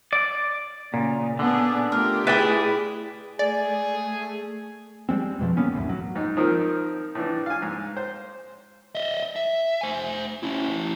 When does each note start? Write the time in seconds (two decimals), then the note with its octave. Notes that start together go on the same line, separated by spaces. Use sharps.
0.13 D5
0.94 A#2 C#3
1.39 D3 B3 D4 G#4
1.92 A3 F4 G4 A#4
2.27 E4 G#4 B4 D5 G5
3.39 A3 G#4 D5
5.09 G3 G#3 C4
5.39 F2 B2 F3
5.57 F#3 A#3 B3 C#4
5.72 G1 D#2 A2
5.89 F#3
6.15 G#2 D#4
6.37 D#3 F3 C4 A#4 D#6
7.15 A2 E3 D4
7.46 F5 G#5
7.62 G#2
7.97 C5
8.95 D#5 E5
9.36 E5
9.81 C5 G#5
10.43 C#4 E4